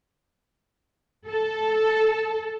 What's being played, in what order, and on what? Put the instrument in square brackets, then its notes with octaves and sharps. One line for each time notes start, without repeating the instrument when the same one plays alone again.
[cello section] A4